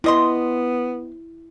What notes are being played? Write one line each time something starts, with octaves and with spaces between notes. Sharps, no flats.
C3 B3 E4 D#5 C6